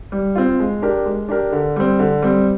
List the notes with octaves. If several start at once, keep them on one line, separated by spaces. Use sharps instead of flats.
G3
C4 F4
G#3
D4 G4 A#4
G#3
D4 G4 A#4
D3
G3 C4
D3
G3 C4